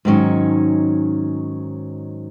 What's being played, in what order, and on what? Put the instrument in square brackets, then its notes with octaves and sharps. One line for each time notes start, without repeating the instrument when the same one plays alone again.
[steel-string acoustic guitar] G#2 D#3 F#3 C#4